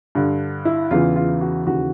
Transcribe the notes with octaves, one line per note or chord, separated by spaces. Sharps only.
G2 D3
E4
E2 C#3 E3 F4
F4
F#4
D#2 C#3 E3 F#4